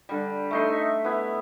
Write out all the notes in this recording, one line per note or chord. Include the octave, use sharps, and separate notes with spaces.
D3 G3
A3 D#4 C6
E5
B3 E4